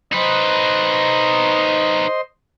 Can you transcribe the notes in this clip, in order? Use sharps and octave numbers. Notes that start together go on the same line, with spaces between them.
D#4 B4 C5 D#5 C6